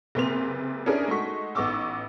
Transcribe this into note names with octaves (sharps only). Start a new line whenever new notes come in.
F#1 C3 A#3 B4 C6 F7
C#4 D4 E4 G#4 A#4 B4
G#3 A3 D#4 F#4 C#6 B6
A1 B3 D#4 C#6 D6 E6